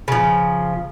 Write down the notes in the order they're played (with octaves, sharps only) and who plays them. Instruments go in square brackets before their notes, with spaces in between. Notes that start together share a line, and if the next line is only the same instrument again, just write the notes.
[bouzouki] C#3 F3